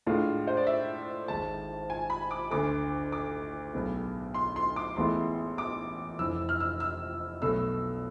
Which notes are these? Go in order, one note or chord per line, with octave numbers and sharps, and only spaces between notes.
A2 G#3 D4 F4
C5
D5
E5
G#1 G#2 G#3 A5
G#5
B5
D6
D2 D3 A3 D6
D6
B1 A2 G#3 B3
C6
C6
D6
A1 A2 G#3 B3 E4 C6
D6
F1 F2 E3 E6
F6
E6
E6
B1 B2 A3 E6